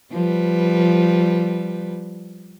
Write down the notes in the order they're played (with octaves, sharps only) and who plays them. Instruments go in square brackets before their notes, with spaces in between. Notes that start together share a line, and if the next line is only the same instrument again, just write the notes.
[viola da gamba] F3 G3 B4